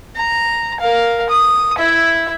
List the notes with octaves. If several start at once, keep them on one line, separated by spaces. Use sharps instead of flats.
A#5
A#4 F5
D#6
E4 E5